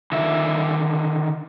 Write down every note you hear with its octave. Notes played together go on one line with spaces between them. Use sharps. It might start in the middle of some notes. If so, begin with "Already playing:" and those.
D3 D#3 E5